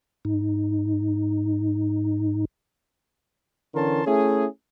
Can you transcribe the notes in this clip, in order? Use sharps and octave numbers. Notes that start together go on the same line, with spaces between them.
G#2 D#4
D3 E3 C#4 A#4 A5 C6
A3 C#4 E4 G#4